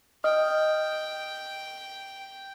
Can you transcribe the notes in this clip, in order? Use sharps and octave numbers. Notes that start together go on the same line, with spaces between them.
D#5 G5 D#6 F6